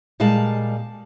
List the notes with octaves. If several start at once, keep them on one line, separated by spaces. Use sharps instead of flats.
A#2 G3 G#3 F5 A5